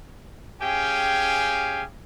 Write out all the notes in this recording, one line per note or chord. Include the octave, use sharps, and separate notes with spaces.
C#4 G4 G#4 F5 G5 G#5